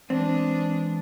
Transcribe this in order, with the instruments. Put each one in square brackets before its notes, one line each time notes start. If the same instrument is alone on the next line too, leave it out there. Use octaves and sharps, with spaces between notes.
[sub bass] E3 [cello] G#3 D4 [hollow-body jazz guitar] C4